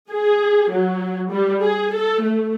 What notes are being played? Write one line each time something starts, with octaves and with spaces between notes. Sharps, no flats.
G#4
F#3
G3
G#4
A4
A3